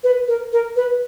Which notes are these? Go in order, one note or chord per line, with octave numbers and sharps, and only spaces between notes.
B4
A#4
A#4
B4